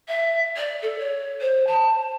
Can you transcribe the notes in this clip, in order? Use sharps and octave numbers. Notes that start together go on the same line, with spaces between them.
E5
D5
A4
C#5
C5
A5